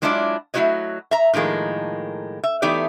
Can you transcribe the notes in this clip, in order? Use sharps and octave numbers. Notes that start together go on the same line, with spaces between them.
F#3 G#3 D4 E4 F4 D5
F#3 A3 E4 F#4 C#5 D#5
E5 A#5
A2 D#3 F3 G#3 A#3
E5
E3 A3 B3 D#4 G4 D5